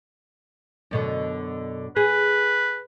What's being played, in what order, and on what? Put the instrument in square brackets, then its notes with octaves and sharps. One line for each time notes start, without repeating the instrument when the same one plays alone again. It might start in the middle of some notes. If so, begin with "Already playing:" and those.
[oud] F#2 B2 D3
[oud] G#4 [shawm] B4